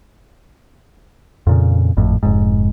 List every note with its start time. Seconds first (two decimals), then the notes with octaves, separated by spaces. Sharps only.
1.47 F2 A#2 C#3
1.97 G#1 F2 A2
2.23 F1 G#2